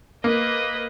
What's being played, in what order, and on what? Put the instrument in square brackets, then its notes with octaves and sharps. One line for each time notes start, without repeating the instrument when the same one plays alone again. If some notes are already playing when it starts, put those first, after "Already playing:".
[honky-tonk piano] A#3 [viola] B4 D#5